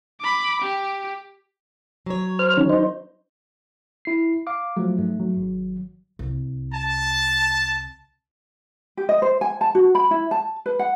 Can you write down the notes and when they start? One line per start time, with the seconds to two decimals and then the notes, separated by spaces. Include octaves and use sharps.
0.21 B5 D6
0.62 G4
2.06 F#3 C#5
2.39 C5 F6
2.57 D#3 C#4
2.69 D#4 C5
4.05 E4 C7
4.47 F5 D6
4.76 F3 F#3 A3
4.98 G#2 A3
5.19 F#3
5.37 G#1
6.19 C2
6.72 A5
8.97 G4
9.09 D#5
9.22 C5
9.41 G#5
9.61 A5
9.75 F#4
9.95 B5
10.11 E4
10.31 A5
10.66 B4
10.79 F#5